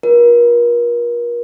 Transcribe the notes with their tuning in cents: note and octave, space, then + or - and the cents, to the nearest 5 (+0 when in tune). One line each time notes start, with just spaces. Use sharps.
F4 +25 A#4 +40